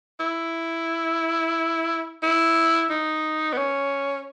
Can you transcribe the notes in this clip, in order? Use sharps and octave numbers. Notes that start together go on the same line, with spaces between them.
E4
E4
D#4
B3
C#4